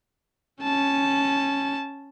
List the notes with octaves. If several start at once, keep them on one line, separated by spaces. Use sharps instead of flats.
C#4 A5